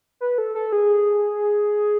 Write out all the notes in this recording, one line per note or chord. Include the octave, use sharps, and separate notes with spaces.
B4
A4
A4
G#4